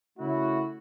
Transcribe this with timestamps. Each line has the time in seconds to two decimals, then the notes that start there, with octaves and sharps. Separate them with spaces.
0.18 C#3 A3 C#4 E4 F#4